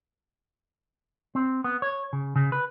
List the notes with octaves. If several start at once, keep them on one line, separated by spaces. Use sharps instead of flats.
C4
B3
C#5
C#3
C#3
B4